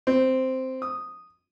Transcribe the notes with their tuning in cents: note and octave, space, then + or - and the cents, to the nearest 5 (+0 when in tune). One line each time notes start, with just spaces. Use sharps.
C4 -5
D#6 -5